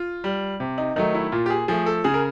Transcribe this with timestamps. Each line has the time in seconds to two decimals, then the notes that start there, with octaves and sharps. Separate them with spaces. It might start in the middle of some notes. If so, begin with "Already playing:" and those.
Already playing: F4
0.24 G3
0.60 C3
0.78 D#4
0.96 D#3 F#3 A3 D#4
1.15 E4
1.32 A#2 F4
1.46 G4
1.50 G#4
1.68 F3 A3 G#4
1.86 A4
2.04 C#3 G#4
2.14 A#4